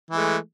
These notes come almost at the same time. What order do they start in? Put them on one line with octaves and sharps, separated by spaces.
E3 G#3 A3